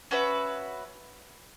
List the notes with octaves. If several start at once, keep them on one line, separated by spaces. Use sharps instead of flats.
C#4 F#4 B4 E5